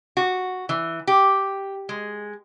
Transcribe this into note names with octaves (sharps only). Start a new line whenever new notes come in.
F#4
E3
G4
G#3